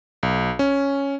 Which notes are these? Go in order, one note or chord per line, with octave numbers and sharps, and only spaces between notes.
B1
C#4